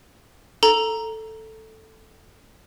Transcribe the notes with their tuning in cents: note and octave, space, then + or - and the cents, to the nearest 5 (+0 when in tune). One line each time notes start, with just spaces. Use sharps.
A4 +0 A#5 +0